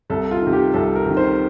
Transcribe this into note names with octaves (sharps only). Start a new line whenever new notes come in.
C2 A4
F4
C3 D#3
G4
C2 A4
A#4
C3 D#3
C5